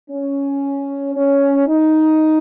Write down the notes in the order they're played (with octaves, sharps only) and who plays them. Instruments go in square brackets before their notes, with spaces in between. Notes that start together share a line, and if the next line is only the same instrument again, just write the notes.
[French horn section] C#4
C#4
D#4